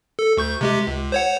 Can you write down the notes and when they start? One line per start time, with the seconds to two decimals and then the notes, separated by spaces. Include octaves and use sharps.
0.19 A4
0.37 D2 C#6 G6
0.61 C3 G#3 G4
0.87 C#2
1.12 C5 C#5 F#5